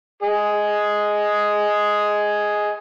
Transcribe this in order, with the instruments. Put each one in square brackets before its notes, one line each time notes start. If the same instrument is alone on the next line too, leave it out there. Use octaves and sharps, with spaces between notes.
[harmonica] G#4 D#5